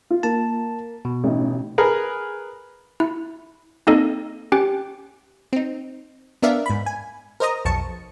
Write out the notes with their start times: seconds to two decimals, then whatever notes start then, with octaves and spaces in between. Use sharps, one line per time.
0.11 F4
0.23 A#3 A5
1.05 B2
1.24 A1 D#4
1.78 G#4 A#4 B4
3.00 E4
3.87 A#3 C4 D#4 A4 D#5
4.52 C#4 G4 G5
5.53 C4 D#4
6.42 B3 D4 A#4 D5 E5 F5
6.66 G#2 B5
6.86 G#5
7.40 A#4 C5 D#5 A#5 D#6
7.65 B1 F2 A5 C#6 C#7